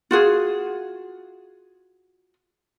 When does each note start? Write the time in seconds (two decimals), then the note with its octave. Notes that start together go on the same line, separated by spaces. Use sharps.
0.11 F4 F#4 G#4